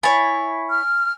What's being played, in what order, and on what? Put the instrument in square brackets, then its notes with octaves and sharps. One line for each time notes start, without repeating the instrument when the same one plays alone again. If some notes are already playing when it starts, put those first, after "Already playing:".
[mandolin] E4 C#5 [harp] G#5 A6
[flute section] F6